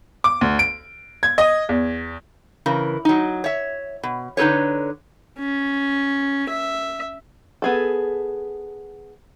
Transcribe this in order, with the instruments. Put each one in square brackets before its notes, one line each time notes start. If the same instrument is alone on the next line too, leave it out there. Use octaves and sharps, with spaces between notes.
[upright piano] D6
D2
D7
G#6
D#5
E2
[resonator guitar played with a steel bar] C#3 E3 A#4
F#3 D#4
C#5 E5
B2
D3 D#4 A4 B4 C#5
[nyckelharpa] C#4
E5
[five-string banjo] B3 G#4 A4